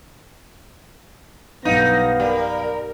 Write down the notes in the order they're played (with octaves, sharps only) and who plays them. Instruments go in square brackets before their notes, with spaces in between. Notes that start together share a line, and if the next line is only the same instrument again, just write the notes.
[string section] B1 G2 A#6 [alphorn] B3 [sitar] D#4 [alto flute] F5
[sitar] G3 [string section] A#4